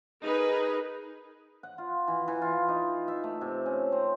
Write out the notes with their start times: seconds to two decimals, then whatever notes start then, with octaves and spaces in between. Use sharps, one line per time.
0.22 D#4 G#4 A#4 B4
1.63 F#5
1.78 F4
2.08 E3
2.28 E3
2.42 F4
2.69 D#4
3.08 E5
3.24 A3
3.41 C3
3.66 C#4
3.92 C4